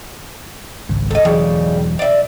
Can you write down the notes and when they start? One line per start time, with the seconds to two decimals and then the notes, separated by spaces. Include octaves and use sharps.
0.89 G#1 C#2
1.11 A4 D#5
1.25 E1 C#3 E3 F#3 G3
1.99 D5 E5